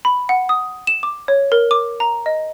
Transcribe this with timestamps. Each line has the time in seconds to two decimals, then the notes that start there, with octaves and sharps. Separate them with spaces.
0.05 B5
0.29 F#5
0.49 D#6
0.87 E7
1.03 D6
1.28 C#5
1.52 A#4
1.71 D6
2.00 A#5
2.26 D#5